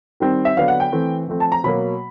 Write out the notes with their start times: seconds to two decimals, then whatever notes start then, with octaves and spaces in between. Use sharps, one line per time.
0.20 D#3 G3 C4
0.45 E5
0.57 D3 F#3 B3 D4 F5
0.68 F#5
0.80 G5
0.92 E3 A3 C4
1.28 F3 A3 C4
1.40 A5
1.52 A#5
1.64 B2 F#3 A#3 B5